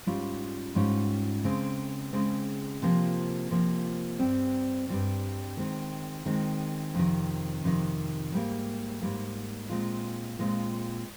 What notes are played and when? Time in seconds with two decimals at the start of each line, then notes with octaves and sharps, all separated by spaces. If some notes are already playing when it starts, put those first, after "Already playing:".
0.06 G#2 G3 C#4 F4
0.75 G#2 G3 C#4 F4
1.44 C#3 G#3 C4
2.13 C#3 G#3 C4
2.82 C3 F3 A#3 F4
3.51 C3 F3 A#3 F4
4.19 G2 G3 C4
4.88 G2 G3 C4
5.57 D#3 G#3 C4
6.26 D#3 G#3 C4
6.94 F2 C3 D#3
7.64 F2 C3 D#3
8.32 G#2 G3 A#3
9.02 G#2 G3 A#3
9.70 A#2 G#3 C4 F4
10.39 A#2 G#3 C4 F4